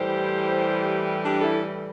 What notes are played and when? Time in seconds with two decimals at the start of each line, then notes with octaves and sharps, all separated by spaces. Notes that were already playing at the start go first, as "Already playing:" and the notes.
Already playing: A2 E3 G3 G4 C5
1.22 D4 G4
1.42 E4 A4